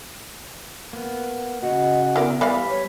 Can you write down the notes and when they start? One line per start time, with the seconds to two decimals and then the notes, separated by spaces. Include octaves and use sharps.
0.93 A#3 B3
1.63 C#3 F#4 D#5
2.16 B3 E4 A#4 D5
2.41 E3 G3 D5 F5 B5
2.69 C#5